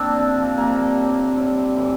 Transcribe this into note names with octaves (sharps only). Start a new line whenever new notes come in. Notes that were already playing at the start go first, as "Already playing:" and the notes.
Already playing: A#3 C4 D4
C3 F3
C3 G3 A#3
A2 G3
A2 G3
A2 E3 G3